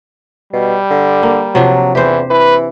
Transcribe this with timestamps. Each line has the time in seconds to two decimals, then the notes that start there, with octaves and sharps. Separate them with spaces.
0.53 B2 G3
0.90 D3
1.23 A#3
1.55 C3 F3 F#3 D4
1.95 E2 E3 G4 C5
2.30 E3 B4